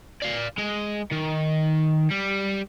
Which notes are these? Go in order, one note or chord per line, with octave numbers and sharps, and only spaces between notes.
D5 F5
G#3
D#3
G3